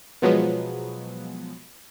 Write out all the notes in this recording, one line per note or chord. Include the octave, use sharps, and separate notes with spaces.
B2 F3 F#3 G#3 B3